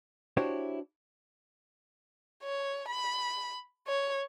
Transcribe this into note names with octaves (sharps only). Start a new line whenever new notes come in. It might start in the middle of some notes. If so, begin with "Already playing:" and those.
D4 E4 F#4 G4 C5 C#5
C#5
B5
C#5